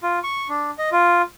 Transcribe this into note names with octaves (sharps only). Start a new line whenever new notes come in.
F4
C#6
D4
D#5
F4